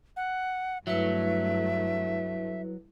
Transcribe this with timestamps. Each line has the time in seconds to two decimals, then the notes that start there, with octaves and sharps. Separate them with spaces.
0.16 F#5
0.87 G2 F#3 A3 E4 B4 E5